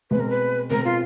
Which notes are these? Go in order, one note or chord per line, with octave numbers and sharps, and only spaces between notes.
B2 G#3 C4 B4
A#4
B4
B2 G#3 C4 A#4
F4